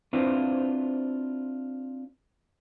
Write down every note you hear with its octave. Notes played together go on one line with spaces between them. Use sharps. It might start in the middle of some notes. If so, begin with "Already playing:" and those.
C4 D4 E4 F4 B4 C5